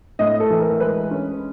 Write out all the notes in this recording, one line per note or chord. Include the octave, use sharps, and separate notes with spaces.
A2 D#5
A4
E3
A#4
G#3 B4
C#4